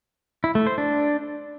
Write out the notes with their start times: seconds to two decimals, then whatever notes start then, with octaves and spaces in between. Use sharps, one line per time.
0.44 E4
0.55 A3
0.67 C5
0.78 D4